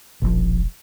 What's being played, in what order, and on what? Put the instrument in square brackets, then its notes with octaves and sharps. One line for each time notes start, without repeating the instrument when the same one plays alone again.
[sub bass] E1 [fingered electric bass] A#1 C#3 F3